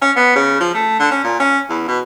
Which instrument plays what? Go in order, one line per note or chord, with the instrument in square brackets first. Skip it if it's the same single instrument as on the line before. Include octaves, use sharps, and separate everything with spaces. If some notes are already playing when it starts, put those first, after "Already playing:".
[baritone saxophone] C#4
B3
C#3
F3
A3
D3
C#4
A#2
C#4
E2
B2